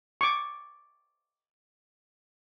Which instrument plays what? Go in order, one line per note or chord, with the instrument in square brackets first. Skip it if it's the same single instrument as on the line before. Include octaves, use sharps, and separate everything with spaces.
[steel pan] C#6 D6